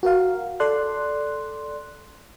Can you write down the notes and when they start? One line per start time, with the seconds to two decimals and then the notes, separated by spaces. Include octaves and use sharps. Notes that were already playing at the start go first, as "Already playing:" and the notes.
0.03 F#4 A#4 F5
0.60 A4 D5 C6 F#6